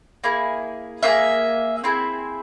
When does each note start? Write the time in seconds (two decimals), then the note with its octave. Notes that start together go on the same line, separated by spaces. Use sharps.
0.24 A#3 E4 G#4
1.03 A#3 F4 G#4 E5
1.84 C4 E4 G#4 C5